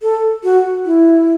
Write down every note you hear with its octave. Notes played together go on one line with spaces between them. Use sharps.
A4
F#4
E4